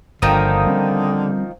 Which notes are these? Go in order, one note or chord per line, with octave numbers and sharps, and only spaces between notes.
G1 D3 D#3 F3 A#3 G5 A#5 D#6
G3 C4 C#4